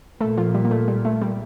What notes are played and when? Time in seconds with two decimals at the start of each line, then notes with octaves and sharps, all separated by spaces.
0.21 A#2 A3 A4
0.37 F3 F4
0.55 G3
0.65 A#3
0.71 A3
0.88 G3
1.05 A3
1.22 G3